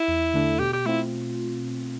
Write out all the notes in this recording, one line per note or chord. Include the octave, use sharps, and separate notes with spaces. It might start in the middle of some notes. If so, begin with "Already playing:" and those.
Already playing: E4
E2
D3 A3 D4 A4
B2 G4
G4
A3 C4 E4 F4